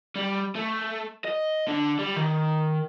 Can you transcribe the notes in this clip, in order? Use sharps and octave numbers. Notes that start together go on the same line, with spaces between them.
G3
A3
D#5
D3
G3
D#3